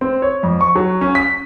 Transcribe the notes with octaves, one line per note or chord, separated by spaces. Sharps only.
C4
C#5
F2
C#6
F#3
C#4
B6